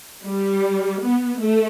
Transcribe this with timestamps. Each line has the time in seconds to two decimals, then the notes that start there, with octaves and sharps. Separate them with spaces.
0.24 G3
1.00 B3
1.38 A3